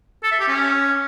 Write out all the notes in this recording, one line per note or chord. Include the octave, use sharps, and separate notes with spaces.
A4
E5
G4
C#4